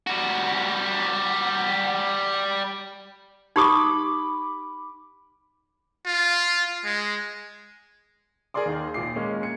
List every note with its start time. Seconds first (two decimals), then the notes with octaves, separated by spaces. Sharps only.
0.07 G3 F#4
3.56 D#4 G4 B5 D6 D#6
6.06 F4
6.85 G#3
8.54 G#4 A#4 D5 C6 D6
8.66 D#2 D#3
8.94 D#2 A#2 D6 C7
9.16 G#3 A#3 C#4
9.43 G#6 C#7